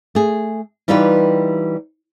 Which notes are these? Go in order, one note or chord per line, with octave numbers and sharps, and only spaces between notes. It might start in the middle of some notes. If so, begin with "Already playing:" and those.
A3 G#4
E3 G3 D#4 F4 G4 B4